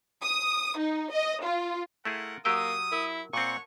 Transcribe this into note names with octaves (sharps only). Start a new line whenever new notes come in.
D#6
D#4
D#5
F4
A3 E4 F4 G#4 A#4 F#5
F#3 A#3 G4 F#5 G5 D#6 E6
E4 A#4
A#2 C4 C#5 F#5 A5 C#6